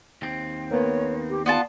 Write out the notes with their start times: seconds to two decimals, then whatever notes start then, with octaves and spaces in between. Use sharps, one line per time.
0.22 D#2 C4
0.71 A#3 B3 C#5
1.30 G4
1.46 B3 F4 D5 A5